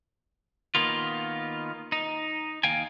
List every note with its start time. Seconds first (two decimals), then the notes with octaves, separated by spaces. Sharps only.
0.75 D#3 A#3 B3 F4
1.92 D#4
2.63 D#2 F5 G5 G#5